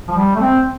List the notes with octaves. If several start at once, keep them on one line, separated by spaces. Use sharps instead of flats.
F3
G3
A3
C4